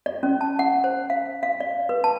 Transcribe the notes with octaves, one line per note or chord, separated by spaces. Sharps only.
D5
C#4
A5
F#5
C5
F5
F5
D5
B4
A5